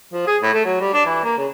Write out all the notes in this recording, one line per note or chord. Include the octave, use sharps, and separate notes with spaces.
F3
G#4
A2
A3
F#3
G3
D4
E3
A#3
C#3